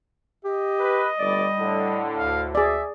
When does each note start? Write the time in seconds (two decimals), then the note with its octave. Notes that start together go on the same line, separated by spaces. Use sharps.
0.44 G4 D#5
0.79 B4
1.18 G1 A2 G3 D5
1.58 A2 D3
2.17 D2 F5
2.55 G#4 D5 E5